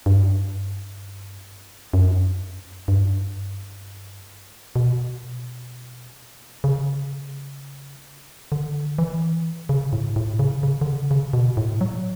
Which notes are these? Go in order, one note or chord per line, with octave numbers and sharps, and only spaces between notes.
G2
F#2
G2
B2
C#3
D3
E3
C#3
A2
A2
C#3
C#3
D3
C#3
C#3
B2
A2
F#3